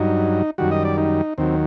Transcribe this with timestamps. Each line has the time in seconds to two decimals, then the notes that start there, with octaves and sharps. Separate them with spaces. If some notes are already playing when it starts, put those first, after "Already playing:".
Already playing: G2 F#3 D#4
0.58 F#2 D#3 G3 F#4
0.71 D#5
0.85 D5
0.98 D#4
1.38 D#2 D#3 F#3 C4